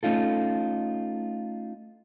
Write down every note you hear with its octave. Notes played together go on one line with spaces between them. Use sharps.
A3 C#4 D#4 F4 A4